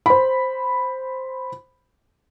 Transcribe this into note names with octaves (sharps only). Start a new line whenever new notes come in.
C5 B5